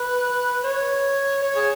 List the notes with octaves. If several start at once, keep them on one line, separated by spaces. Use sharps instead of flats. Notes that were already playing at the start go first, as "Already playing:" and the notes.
Already playing: B4
C#5
C#5
G#4